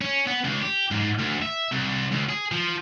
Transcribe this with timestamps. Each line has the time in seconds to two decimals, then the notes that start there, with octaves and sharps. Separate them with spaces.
0.01 C#4
0.27 B3
0.44 C#2
0.62 G4
0.91 G#2
1.18 D2
1.42 E5
1.72 C2
2.12 C#2
2.29 G#4
2.52 F3